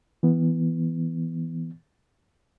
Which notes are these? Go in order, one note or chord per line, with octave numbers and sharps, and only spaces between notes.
E3 B3